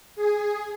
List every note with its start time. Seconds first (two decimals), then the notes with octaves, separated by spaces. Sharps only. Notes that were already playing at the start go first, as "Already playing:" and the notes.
0.16 G#4